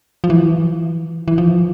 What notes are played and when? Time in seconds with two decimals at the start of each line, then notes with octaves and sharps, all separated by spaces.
0.24 F3
0.30 E3
1.28 E3
1.38 F3